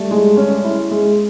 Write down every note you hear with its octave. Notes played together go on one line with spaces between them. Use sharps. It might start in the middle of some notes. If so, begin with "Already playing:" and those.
Already playing: G3 A3
G#3
C#4
E4
G#3